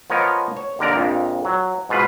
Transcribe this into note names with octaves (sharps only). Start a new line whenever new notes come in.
F3 B3 A#4 C#5 D#5
C#5
D#2 D3 A#4 D5 A#5
A#1 F2
F#3
G#2 B2 F4 B4